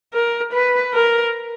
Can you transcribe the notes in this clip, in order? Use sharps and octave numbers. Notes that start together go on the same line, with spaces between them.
A#4
B4
A#4